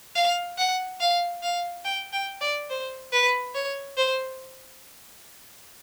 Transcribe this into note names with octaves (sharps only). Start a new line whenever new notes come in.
F5
F#5
F5
F5
G5
G5
D5
C5
B4
C#5
C5